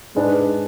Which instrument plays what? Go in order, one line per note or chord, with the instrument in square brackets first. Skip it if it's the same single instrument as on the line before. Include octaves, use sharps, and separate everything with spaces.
[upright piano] G#2 G#3 D4 G#4 B4